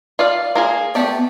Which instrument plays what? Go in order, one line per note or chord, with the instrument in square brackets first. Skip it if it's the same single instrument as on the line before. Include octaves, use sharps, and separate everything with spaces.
[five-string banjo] F4 D5 F5
A#3 F4 G#4
[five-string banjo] A3 G4 D5 [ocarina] B3